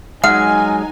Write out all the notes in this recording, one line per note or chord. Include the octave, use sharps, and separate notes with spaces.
F#3 G#3 D#4 F#5 G#5 F6